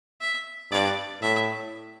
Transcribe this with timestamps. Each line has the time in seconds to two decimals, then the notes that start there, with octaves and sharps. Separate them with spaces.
0.21 E5
0.71 G2 D5
1.22 A2 E5